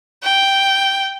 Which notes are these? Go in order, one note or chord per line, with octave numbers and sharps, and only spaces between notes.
G5